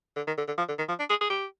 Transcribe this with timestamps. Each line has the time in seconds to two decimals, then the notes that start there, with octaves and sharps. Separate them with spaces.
0.16 D3
0.27 D#3
0.37 D3
0.48 D3
0.58 F3
0.68 D3
0.78 D#3
0.89 F3
0.99 D4
1.10 G#4
1.21 G#4
1.30 G4